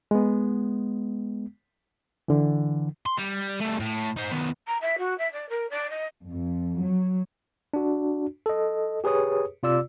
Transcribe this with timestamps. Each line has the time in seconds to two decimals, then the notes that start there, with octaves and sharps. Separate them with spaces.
0.11 G#3 B3
2.28 D3 E3
3.06 C6
3.18 G3
3.61 G3 A3
3.80 A2
4.17 D#4 C5
4.32 D#3 B3
4.67 A#5
4.81 E5
4.98 F#4
5.18 E5
5.32 D5
5.49 A#4
5.70 D5
5.90 D#5
6.29 F2
6.83 F#3
7.74 D4 F#4
8.46 A4 D#5
9.04 G4 G#4 B4 C#5 D#6
9.63 C3 F4 D5 E6